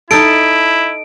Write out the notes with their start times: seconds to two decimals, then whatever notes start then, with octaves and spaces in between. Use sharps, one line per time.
0.11 D#4 E4 A4 D7